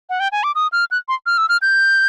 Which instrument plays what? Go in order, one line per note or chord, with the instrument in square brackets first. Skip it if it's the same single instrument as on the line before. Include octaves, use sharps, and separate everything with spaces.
[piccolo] F#5
G5
G#5
D6
D#6
F6
F#6
C6
F6
E6
F6
G6